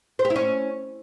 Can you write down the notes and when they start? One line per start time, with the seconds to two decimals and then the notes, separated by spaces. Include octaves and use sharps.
0.19 C5
0.25 G4
0.30 E4
0.36 C#4